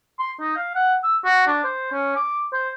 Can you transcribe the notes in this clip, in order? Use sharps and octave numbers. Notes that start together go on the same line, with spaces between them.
C6
D#4
F5
F#5
E6
F#4
D4
C5
C#4
D6
C5